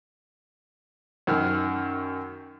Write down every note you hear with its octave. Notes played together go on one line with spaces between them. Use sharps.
F#2 D#3 F6